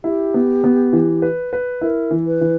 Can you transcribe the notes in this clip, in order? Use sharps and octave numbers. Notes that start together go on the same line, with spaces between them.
E4 G4
B3
B3
E3
B4
B4
E4 A#4
E3
B4
E3